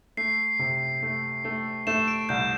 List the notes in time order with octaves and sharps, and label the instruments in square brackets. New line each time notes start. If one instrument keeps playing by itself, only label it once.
[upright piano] A3 [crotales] C7
[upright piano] C3
A3
A3
[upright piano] A3 [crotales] E7
[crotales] D7
[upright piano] C2 [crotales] G6